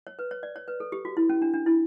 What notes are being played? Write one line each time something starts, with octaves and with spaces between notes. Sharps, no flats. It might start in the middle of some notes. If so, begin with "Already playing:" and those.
C#5
B4
C#5
D5
C#5
B4
A4
G4
F#4
E4
C#4
D4
D4
E4